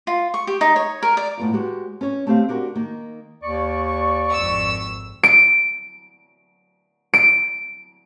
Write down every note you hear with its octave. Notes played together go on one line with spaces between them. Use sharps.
F4
C#6
G4
D#4
C#5
A#4
D5
A2 B3 F4
G#3 F#4 G4 C#5
C#4 C#5
A3 C4 G4 D#5 F5
D4 F#4 G4 A#4 C5
D#3 A#3 D#4
D#2 D5 C#6
G#1 F2 E6
D7
D7